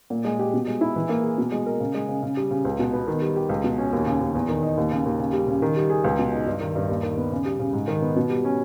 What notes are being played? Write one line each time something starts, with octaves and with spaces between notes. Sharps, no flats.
A#2
G#3
G4
B2
G#3
E4
E3
A#3
G#4
B2
G#3
A#4
C#3
G#3
C#3
C#3
G3
C#3
C#2
B2
B3
D#3
G3
G4
C#2
B2
C#4
D#2
C#3
D#2
E2
D#3
D#4
D#2
C#3
D#2
C#3
G3
C#3
D#3
G3
G#4
C#2
B2
D#4
G2
D#3
G2
D#2
D#3
B3
C#3
G3
C#3
G#2
D#3
B3
B2
G3
C#4